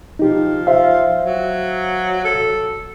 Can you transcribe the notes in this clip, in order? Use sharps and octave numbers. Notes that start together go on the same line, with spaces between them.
F3 D#4 G4
C5 E5 F5
F#3
A4